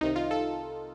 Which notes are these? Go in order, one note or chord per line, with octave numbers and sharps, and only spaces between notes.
C2 C3 D#3 D#4
F4
A4